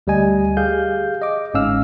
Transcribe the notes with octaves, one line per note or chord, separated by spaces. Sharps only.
D2 G3 G4 D#5 G#5
G4 G#4 F5 G6
D#5 D6
G1 G#2 C#4 F5 E6 F6